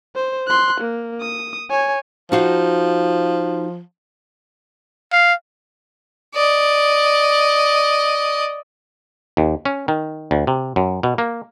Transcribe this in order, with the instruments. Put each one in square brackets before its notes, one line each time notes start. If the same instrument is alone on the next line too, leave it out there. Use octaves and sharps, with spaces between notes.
[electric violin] C5
C6 F#6
A#3
D#6
C#5 G#5
[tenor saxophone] F3 [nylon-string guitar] D#4 F#4 F5
[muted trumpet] F5
[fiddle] D5 D#5
[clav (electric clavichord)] D#2
C#4
D#3
D2
C3
F#2
B2
A#3